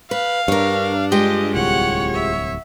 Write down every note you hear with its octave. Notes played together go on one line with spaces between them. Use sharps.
B4 F5
G2 D4 A#4 C#5
G#3 F4 G4 D#5
D1 C2 C#5 F#5
E5